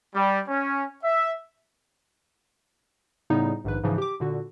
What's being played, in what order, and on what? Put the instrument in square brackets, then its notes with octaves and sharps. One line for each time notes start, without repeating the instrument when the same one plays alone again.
[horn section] G3
C#4
E5
[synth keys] A2 C#3 G3 B3 D#4
A#1 G#2 D#3 B4
G#2 C#3 E3 F3
G4 D6
A#2 D3 F#4